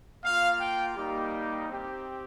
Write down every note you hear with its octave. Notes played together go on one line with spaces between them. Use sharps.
A#3 F4 F5
G5
G3 A#3 D#4 G4
C4 G4